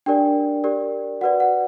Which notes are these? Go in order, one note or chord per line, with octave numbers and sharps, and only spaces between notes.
D4 G4 A#4 D5 G5
G4 A#4 D5
F#4 B4 D5 F#5
F#5